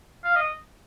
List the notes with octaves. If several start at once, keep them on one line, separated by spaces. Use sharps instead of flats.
F5
D#5